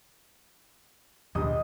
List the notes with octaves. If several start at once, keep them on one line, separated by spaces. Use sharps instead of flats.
A#1 D#2 B2 G4 D#5 D#6